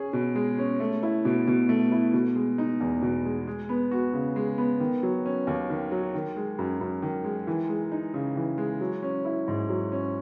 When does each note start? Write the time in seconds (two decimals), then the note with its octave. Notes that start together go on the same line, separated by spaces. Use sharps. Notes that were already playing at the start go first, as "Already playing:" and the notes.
Already playing: C#4 G#4
0.13 B2
0.35 G#3
0.58 C#4
0.80 A3
1.03 E4
1.25 B2
1.47 B2
1.69 A3
1.92 E4
2.14 B2
2.36 G#3
2.58 D#4
2.80 E2
3.02 B2
3.25 G#3
3.48 G#3
3.69 B3
3.91 F#4
4.13 C#3
4.36 G#3
4.58 B3
4.80 D#3
5.03 F#3
5.26 C#4
5.47 D#2
5.70 D#3
5.92 F#3
6.14 D#3
6.37 G#3
6.59 F#2
6.81 F#2
7.02 D#3
7.24 G#3
7.47 E3
7.69 G#3
7.92 D#4
8.14 C#3
8.37 E3
8.58 G#3
8.81 F#3
9.03 C#4
9.25 E4
9.48 G#2
9.69 F#3
9.92 C#4